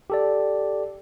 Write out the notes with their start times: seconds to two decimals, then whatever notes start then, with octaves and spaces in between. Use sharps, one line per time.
0.10 G4 A4 D5